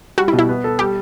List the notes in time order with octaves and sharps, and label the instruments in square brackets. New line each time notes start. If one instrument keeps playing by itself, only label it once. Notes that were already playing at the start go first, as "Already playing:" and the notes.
[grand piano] G3 [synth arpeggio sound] F#4
[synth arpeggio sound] E4
[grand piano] B2
[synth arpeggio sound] E4
[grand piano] B3
A4
[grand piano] G3 [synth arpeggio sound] G4